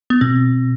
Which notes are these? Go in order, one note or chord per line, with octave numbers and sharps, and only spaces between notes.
B3
B2 C4